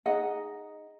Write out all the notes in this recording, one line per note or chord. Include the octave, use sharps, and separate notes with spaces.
D#4 G#4 D#5 F#5